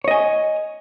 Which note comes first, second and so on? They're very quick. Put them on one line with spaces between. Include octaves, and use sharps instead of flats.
C#5 D#5 G#5